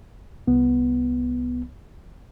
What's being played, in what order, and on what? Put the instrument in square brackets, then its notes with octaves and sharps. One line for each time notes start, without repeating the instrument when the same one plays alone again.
[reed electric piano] C2 B3